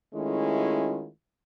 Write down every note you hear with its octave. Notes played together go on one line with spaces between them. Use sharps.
D#3 G#3 A3 C#4 E4 F4